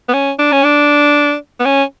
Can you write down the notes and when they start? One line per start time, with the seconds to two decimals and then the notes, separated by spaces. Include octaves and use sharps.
0.09 B3
0.14 C#4
0.39 D4
0.52 C#4
0.64 D4
1.60 B3
1.65 C#4